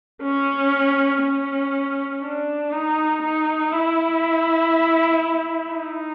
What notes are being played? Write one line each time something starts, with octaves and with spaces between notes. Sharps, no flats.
C#4
C#4
D4
D#4
D#4
E4
D#4